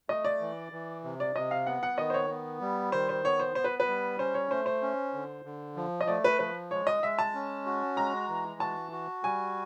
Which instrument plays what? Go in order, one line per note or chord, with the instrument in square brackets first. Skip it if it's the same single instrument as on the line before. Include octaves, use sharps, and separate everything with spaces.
[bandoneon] A3 [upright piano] D#5
[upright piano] D5
[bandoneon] E3
E3
C3
[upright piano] D5
[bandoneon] C3 [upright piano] D#5
[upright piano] F5
[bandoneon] B3 [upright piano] F#5
[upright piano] F#5
[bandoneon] D#3 [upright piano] D#5
[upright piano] C5
C#5
[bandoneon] B3
G3
[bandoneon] D#3 [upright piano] C5
[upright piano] C5
[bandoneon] B3 [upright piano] C#5
[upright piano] C5
[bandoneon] B3 [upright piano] C5
[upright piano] B4
B4
[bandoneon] G3
[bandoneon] C#4 [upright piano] C5
[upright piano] C#5
[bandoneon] A3 [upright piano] C5
[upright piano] C5
[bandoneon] C#4
D3
D3
F3
[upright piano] D#5
[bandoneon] A3 [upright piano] D5
[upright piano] B4
[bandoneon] F3 [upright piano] B4
[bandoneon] G#3 [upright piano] C#5
[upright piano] D#5
[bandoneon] G#3 [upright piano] E5
[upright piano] A5
[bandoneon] C#4
F#4
[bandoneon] G#3 [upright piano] A#5
[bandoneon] E3
[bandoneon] F#4 [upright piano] A5
[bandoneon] F#4
[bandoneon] G3 [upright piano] G#5